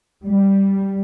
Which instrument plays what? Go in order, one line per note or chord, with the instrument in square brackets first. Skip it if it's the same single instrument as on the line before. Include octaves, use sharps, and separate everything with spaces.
[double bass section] G3